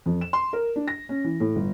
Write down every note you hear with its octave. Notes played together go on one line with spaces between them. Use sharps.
F2
E7
C6
A#4
D4
A#6
C#4
E3
A2
G1